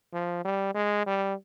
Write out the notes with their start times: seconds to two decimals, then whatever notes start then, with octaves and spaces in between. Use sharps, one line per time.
0.13 F3
0.45 G3
0.74 G#3
1.06 G3